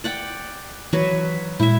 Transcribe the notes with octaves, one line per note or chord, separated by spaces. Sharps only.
D5 F#5 G5
E3 F#3 F#4 B4
A#2 G#3 E4 E5